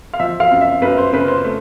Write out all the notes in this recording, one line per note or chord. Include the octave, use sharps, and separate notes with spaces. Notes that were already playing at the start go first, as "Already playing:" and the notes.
F5
F3 E5
F5
F#2
E5
F#2 B4
C5
C#3 B4
C5
A3